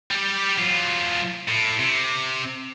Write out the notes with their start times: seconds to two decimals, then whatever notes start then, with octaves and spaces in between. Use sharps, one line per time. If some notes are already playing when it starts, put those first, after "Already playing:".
0.11 G3 G4
0.58 F#3 F4
1.48 A2
1.79 C3